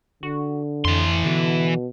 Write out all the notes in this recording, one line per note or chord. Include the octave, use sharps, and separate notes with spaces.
D3 F#4
F2 E3 C6
B2 D3